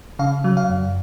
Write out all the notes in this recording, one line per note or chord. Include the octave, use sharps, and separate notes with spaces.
C#3 F5
F#3
F5
F#2